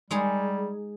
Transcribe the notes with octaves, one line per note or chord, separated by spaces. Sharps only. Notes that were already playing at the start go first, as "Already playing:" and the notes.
G3 G#3 D#4 G#4